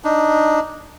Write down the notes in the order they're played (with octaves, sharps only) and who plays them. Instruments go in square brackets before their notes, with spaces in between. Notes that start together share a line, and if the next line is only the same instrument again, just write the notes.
[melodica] D4 D#4